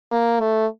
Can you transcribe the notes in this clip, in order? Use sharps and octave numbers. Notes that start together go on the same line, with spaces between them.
A#3
A3